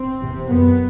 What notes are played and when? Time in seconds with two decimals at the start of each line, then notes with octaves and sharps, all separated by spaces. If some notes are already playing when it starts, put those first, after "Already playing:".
Already playing: C4
0.20 E2 C3
0.49 F#2 B3